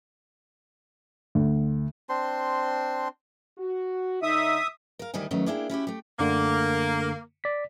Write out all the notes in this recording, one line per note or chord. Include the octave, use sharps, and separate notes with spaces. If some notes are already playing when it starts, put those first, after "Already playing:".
D2
C4 D4 C5 C6
F#4
D3 D#4 E5 D#6
A#4 F5
D2 A2 D#3 G3 E4 G#5
D#3 F#3 A3 B3 C#4
A#3 D4 E4 G#4 E5 G5
C#4 E4 F#4 G4
A3 G4
F#2 D3 A3 A#3
D5 B6